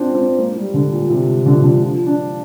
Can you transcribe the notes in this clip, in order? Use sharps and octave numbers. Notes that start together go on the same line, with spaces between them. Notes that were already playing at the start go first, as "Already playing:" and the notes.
Already playing: C4 D4 F4
C4
A#3
G3
D3
A#2
C3
D3
F3
D3
F3
D4